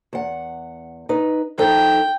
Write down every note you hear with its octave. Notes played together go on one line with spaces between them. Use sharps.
E2 F#5
D#4 B4
F3 D#4 A4 G5